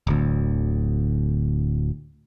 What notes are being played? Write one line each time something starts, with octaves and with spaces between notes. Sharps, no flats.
D1 D2